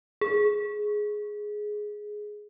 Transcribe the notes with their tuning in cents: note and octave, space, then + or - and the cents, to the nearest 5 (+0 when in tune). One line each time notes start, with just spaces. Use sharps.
G#4 +10